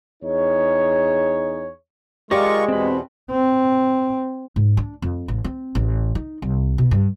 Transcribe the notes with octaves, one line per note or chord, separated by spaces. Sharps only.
E2 D#4 G#4 C#5
G#3 F4 G4 A#4 D5 D#5 C#6 D6
E2 B2 C4 B4
C4
G#2
D4
F2
A1
C4
A1
D#4
C2
B2
G2